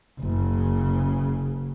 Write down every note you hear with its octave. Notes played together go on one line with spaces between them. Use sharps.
F#1 C#3